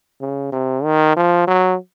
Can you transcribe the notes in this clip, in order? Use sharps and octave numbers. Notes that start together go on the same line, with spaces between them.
C#3
C3
D#3
F3
F#3